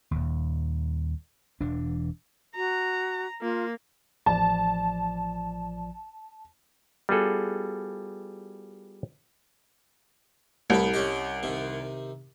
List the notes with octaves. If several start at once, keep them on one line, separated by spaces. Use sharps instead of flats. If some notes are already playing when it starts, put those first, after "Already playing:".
D#1 D#2
E1 E3 D4
F#4 A#5
A#3 F4
A1 F3 D5 A5
G3 B3 F4 F#4 G#4 A4
C2 A2 B4
C#4 G4 D#5
C3 D#3